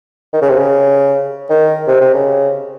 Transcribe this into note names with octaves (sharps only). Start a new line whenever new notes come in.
D#3
C#3
C3
C#3
D#3
C3
C3
C#3